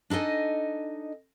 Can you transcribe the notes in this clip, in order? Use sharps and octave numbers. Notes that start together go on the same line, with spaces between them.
D4 D#4 A4 D#5 G#5